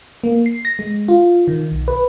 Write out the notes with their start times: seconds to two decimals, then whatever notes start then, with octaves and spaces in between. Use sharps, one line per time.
0.24 A#3
0.46 C7
0.65 A#6
0.79 G#3
1.08 F4
1.48 D#3
1.72 B1
1.88 B4